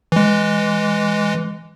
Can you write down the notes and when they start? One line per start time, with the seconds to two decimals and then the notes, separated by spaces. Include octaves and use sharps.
0.12 E3 G#3